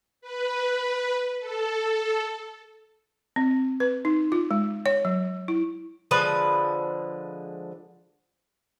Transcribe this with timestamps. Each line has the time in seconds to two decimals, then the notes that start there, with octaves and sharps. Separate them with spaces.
0.21 B4
1.40 A4
3.36 C4
3.80 B4
4.05 D#4
4.32 F4
4.51 G#3
4.86 C#5
5.05 F#3
5.48 E4
6.11 D3 F3 G#3 B4